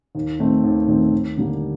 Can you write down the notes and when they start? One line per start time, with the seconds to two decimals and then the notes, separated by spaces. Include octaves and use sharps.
0.15 D#2
0.39 D#3 A3 C4
0.64 D#2
0.88 D#3 A3 C4
1.12 D#2
1.37 D3 G3 A#3